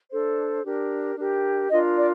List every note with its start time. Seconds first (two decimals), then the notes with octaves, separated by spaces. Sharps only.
0.11 D4 A4 C5
0.64 D4 G4 A#4
1.17 D4 G4 A#4
1.70 D4 F4 A#4 D#5
1.97 D5